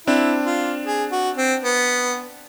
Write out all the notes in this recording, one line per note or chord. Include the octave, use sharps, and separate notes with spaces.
C4 D4 E4
F4
G#4
F#4
C4
B3